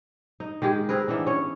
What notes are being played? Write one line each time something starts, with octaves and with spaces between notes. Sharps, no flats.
D#4
D#3 G#3 G4 G#4
C4 G#4 A#4 B4
E3 B3 D4 D#4
C#4 C#5